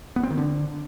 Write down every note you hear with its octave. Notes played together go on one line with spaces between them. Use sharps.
B3
C4
D#3
D3